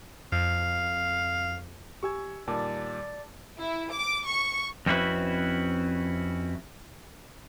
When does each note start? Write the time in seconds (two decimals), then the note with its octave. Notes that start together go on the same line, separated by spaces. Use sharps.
0.32 F2 F5
2.03 G4 G#5 C#6 E6 G#6
2.48 A#2 D#3 G3 D5 A5 D6
3.58 E4
3.91 D6
4.26 C#6
4.86 F2 C4 C#4 E4 F#4 B4